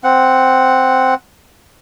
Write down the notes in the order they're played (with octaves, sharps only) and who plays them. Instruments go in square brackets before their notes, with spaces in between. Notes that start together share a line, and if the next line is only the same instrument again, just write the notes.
[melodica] C4 F#5